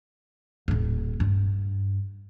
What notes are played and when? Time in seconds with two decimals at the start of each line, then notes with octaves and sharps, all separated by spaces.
0.68 D#1 A2
1.20 G2